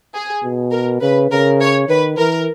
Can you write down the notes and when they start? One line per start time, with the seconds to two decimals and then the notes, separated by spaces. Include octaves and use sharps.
0.14 G#4
0.44 B2
0.72 A#4
1.02 C#3 B4
1.30 C#3 A#4
1.60 C#5
1.89 D#3 B4
2.17 E3 A#4